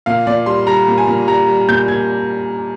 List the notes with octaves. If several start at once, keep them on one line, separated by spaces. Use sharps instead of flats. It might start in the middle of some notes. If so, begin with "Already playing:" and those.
A#2 F5
A#2 D5
G3 C6
G3 A#5
A#2
G#5
A#2
G3 A#5
G3
A#2 G6
A#2 G#6